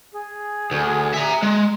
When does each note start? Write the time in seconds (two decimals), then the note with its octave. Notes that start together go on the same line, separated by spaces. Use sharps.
0.12 G#4
0.72 D2
1.14 E5 A#5
1.42 G#3